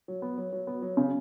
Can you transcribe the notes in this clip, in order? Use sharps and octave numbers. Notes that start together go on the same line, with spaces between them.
F#3
B3
F#3
F#3
B3
F#3
C#3